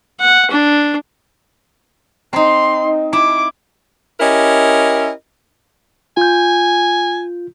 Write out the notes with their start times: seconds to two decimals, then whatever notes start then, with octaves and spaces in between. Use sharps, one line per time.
0.20 F#5
0.50 D4
2.33 C4 D#4 C6
3.13 E4 D6
4.20 C#4 E4 G4 A#4 D#5
6.17 F4 G#5 G6